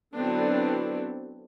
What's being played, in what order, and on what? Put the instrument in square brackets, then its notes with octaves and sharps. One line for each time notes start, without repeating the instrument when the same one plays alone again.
[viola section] D3 F#3 B3 C4 D4 E4